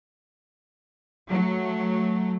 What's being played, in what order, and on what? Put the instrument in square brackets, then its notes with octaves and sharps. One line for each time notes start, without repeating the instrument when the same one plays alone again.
[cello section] F#3 A3